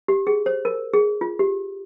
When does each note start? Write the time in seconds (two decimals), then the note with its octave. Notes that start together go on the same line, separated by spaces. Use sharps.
0.08 G4
0.27 G#4
0.46 C5
0.65 A#4
0.94 G#4
1.21 F4
1.39 G4